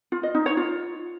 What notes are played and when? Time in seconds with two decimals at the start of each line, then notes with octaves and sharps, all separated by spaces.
0.12 F4
0.23 D#5
0.35 D#4
0.46 C#5
0.57 F4